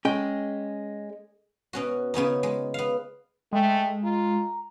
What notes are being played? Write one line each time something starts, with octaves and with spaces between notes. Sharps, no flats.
G#3 C#4 G5
B2 C#4 F#4
C#3 B3 C#4 D#4
G#3
B3 F5
G#3 A3 G5
F4 A#5